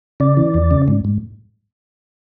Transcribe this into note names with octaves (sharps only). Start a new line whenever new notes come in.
C#3 D5
E3
E2
C#3
G#2
G#2